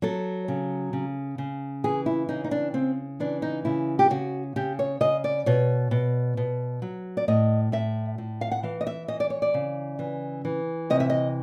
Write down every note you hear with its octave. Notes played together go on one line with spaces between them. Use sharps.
F#3 A4
C#3
C#3
C#3
E3 G#4
E4
C#3 D#4
D#4
D4
C#3 C4
E3 D4
D#4
C#3 E4
G4
C#3 F#4
C#3 G4
C#5
C#3 D#5
D5
B2 C#5
B2
B2
F#3
D5
A2 D#5
A2 E5
A2
F5
F#5
E3 F5
D#5
E5
E3 D#5
D5
C#5
D5
C#3
E3
E3
C3 D#5
E5
D#5